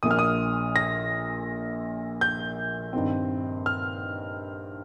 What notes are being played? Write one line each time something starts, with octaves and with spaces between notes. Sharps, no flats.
A#1 A#2 A#3 D#6
F6
D#6
A#6
G6
G2 D#3 C4
F6